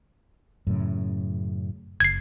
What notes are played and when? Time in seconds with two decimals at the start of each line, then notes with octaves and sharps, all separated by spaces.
0.67 F#2 A2 C#3
2.00 F#1 G#6 C7